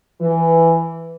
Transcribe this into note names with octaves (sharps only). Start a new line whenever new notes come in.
E3